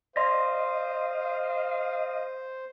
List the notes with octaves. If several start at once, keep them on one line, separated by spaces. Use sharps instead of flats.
C5 D5 D#5 F5 C6